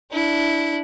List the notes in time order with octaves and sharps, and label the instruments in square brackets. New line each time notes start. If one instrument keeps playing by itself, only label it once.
[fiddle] D4 E4